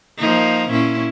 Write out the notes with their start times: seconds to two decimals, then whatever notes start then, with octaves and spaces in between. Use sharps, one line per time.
0.19 F3 A#3 D#4
0.70 A#2 C#4 E4